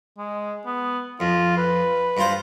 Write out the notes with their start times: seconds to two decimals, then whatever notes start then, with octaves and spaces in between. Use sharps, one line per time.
0.18 G#3
0.66 B3
1.20 F2 F4
1.58 B4
2.17 G2 F4 C5